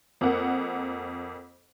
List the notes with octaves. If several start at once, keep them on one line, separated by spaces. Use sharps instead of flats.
F2 A#3 F#5